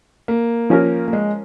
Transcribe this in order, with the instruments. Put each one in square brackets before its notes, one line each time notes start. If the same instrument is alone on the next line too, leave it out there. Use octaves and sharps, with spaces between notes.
[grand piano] A#3
[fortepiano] F3 C#4 A#4
[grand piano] A#3
G#3